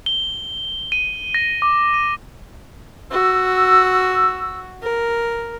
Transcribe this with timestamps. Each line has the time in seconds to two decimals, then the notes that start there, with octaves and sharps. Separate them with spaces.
0.06 G7
0.92 D#7
1.34 A#6
1.62 D6
1.94 D#7
3.12 F#4 E6
4.83 A#4